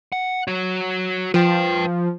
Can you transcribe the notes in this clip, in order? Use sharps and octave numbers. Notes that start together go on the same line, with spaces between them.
F#5
F#4 C#5
F3 B4 G5